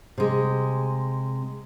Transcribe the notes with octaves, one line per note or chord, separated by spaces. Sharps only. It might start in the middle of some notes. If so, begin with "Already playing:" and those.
C3 G#3